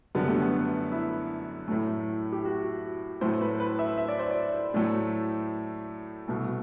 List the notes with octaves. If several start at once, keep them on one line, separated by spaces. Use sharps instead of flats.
F#2 D3 G3 B3
A3
B3
E4
A2 F#3 A3
G4
F#4
A2 F#3 A3 C5
B4
B4
E5
E5
D5
C5
D5
A2 F#3 A3
C2 B2 A3